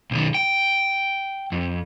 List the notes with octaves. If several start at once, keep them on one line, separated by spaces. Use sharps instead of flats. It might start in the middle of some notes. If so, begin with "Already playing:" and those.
B1 D#3
G5
F2